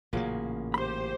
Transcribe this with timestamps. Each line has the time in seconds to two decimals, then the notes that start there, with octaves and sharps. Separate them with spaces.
0.13 A1 A#2 C#3 F#3 A#3
0.74 G4 C5 B5 C6